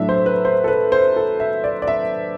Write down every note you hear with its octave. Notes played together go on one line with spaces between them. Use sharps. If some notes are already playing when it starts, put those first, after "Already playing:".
Already playing: A2 F#3 A3 D4 E5
C5
B4
C5
A4
B4
C5
A4
E5
D5
D5
E5